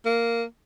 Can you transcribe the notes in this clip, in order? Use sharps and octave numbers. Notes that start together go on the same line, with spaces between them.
A#3